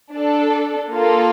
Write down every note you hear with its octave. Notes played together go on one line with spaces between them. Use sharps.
D4 A4
A#3 F4 A4